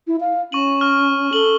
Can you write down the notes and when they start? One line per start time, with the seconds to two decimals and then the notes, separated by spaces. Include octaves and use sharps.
0.07 E4
0.20 F5
0.52 C#4 C#6 D#7 F#7
0.81 C#6 F6
1.33 A4 F#7 G7